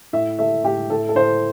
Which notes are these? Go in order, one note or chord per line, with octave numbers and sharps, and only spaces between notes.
A2 E5
A3 E5
A2 G4
A2 A4
A4
A2 C5